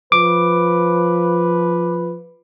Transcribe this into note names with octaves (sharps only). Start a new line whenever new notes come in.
F3 B4 D6